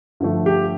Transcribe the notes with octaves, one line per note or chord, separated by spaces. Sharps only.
G2 D3 F3 A3
G4